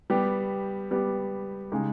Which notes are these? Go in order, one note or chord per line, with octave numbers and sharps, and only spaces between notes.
G3 B3 G4
G3 B3 G4
C#3 G#3 D#4 G4